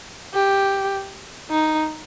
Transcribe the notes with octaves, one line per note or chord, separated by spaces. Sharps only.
G4
D#4